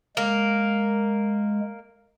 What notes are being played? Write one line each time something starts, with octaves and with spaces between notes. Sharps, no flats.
G#3 A#3